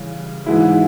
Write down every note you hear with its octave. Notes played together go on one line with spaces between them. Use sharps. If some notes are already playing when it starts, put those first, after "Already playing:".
Already playing: C#3 E3 G3
G#2 E3 G#3 E4